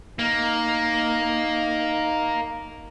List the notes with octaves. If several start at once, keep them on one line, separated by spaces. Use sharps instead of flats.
A#3 D#4